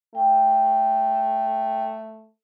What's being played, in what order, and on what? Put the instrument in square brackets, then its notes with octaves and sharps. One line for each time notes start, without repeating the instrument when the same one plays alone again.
[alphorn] A3 [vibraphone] G5